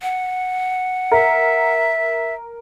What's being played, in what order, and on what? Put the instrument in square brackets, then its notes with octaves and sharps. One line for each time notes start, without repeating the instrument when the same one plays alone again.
[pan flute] F#5
[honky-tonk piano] A#4 [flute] E5